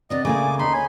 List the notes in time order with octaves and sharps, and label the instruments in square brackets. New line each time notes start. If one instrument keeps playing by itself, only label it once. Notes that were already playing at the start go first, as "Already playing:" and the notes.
[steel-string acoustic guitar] C3 B3 D4 [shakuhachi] D5 [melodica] D#5
[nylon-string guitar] C#3 A#3 G#4 [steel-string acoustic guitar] A3 [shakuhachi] G#5 [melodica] D6
[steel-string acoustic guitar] D2 [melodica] D#4 B5 C6
[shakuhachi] C#5 [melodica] G#5 B5